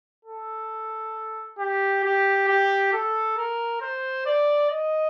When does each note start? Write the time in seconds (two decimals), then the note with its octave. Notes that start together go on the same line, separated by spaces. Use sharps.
0.25 A4
1.59 G4
2.04 G4
2.48 G4
2.93 A4
3.37 A#4
3.81 C5
4.26 D5
4.70 D#5